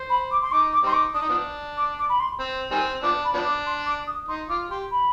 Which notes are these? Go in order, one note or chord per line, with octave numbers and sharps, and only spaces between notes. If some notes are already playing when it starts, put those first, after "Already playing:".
Already playing: C5
B5
D6
C6
D#4 D6
D6
G3 C4 D#4 C6
D6
D4 D#6
D#4
F3 B3 D4
D6
D6
B5
C6
C4
D#3 G3 C4 G#5
F3 B3 D4 D6
B5
F3 B3 D4
D6
C6
D6
D#6
D#4 C6
F4 D6
G4 C6
B5